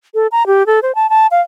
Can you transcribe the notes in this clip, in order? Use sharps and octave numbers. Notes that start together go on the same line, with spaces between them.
A4
A#5
G4
A4
C5
A5
A5
F5